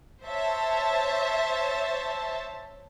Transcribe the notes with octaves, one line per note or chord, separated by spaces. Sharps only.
C5 C#5 E5 A5